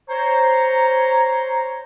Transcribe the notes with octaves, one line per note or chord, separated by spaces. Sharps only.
C5 C#5 A#5